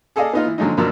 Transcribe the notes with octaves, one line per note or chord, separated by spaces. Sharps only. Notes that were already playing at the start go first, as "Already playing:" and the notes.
G#4 A4 D5 D#5 F5
B3 D#4 F4
E3
D3 F3 F#3 G#3 D#4
F#2 B2 F3 F#3 A#3 D4